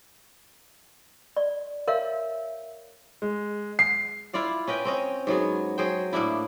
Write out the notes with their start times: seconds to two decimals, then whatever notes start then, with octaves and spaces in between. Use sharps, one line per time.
1.37 D5
1.88 A#4 C#5 E5 F5
3.22 G#3
3.79 C7
4.33 E4 F4 D5 F5
4.68 C#4 B4 D#5 G5
4.85 C4 C#4 D#5
5.27 G#2 F#3 B3 G#4
5.78 F#3 G#4 C5 G5
6.13 A2 A#3 D4 E4